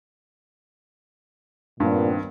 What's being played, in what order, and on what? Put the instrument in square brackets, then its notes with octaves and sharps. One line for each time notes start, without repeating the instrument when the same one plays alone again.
[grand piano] G2 [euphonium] A#2 [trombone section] D#3 B3 C4